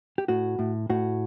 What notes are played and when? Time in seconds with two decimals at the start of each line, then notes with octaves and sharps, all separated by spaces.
0.18 G4
0.28 A2 F#4
0.59 A2
0.90 A2 F#4